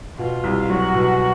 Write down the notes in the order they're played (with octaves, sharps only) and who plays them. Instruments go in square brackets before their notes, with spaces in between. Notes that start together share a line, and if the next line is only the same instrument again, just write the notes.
[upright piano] B2 [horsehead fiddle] F4
[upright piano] C2
[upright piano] F#3 [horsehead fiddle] F#4
[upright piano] B2